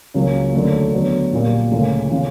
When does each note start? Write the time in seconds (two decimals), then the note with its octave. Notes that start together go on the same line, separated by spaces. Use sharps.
0.14 C#2 C#3 F#3 A#3
0.53 D#2 D3 F#3 A3
0.93 D3 F#3 B3
1.32 A#1 A#2 G3
1.72 D2 C#3 F3 A#3
2.11 C#3 F3